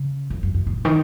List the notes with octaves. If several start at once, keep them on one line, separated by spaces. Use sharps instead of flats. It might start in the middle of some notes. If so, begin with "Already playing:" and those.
Already playing: C#3
F2
F#2
F#2
A#2
D#3